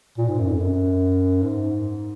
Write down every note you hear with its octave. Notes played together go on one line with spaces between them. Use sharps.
A#2
G#2
F#2
F2
F#2
G#2